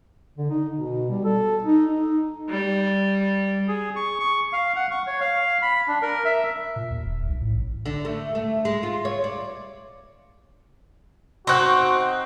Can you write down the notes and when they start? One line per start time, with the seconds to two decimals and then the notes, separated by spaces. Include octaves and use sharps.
0.38 D3
0.50 D#4
0.73 B2
1.10 G3
1.24 A4
1.63 D#4
1.90 D#4
2.50 G3
3.68 G#4
3.96 C#6
4.20 C#6
4.53 F5
4.76 F#5
4.91 C#6
5.07 C#5
5.20 F5
5.62 B5
5.88 D4
6.02 A#4
6.25 E5
6.76 A#2
6.90 D#2
7.05 D#1
7.27 B1
7.41 A2
7.54 A1
7.86 D3
8.05 A3
8.35 A3
8.65 G#3
8.83 F4
9.05 C#5
9.24 D5
11.47 C4 D#4 F#4 C6 C#6 F#6